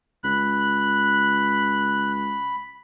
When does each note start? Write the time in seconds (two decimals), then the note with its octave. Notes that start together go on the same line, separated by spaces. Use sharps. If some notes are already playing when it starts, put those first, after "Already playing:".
0.24 C#2 B5 F#6